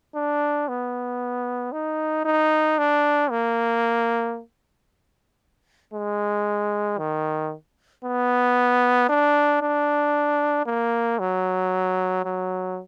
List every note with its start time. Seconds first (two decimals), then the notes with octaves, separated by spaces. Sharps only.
0.15 D4
0.68 B3
1.73 D#4
2.25 D#4
2.78 D4
3.31 A#3
5.94 G#3
6.99 D#3
8.05 B3
9.09 D4
9.62 D4
10.66 A#3
11.19 F#3
12.25 F#3